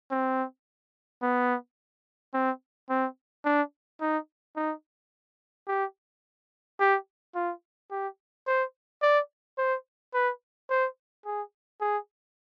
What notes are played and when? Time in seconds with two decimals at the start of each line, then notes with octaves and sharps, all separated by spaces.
0.11 C4
1.22 B3
2.34 C4
2.90 C4
3.45 D4
4.01 D#4
4.56 D#4
5.68 G4
6.80 G4
7.35 F4
7.91 G4
8.47 C5
9.02 D5
9.58 C5
10.14 B4
10.70 C5
11.25 G#4
11.81 G#4